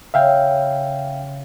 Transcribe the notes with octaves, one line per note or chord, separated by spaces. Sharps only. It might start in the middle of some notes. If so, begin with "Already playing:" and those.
C#3 E5 F5 G5